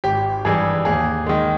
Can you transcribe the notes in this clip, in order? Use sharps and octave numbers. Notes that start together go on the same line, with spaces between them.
G#1 G4
G2 E3 G3 G#4
D#2 G#4
D#3 G#3